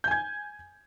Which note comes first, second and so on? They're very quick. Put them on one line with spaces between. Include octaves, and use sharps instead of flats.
G6 G#5 G#6